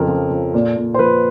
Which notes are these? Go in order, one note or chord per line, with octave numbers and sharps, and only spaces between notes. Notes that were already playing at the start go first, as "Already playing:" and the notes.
Already playing: F2 C#3 A#4
F3
F3
A#2
A#2
C5
F3 B4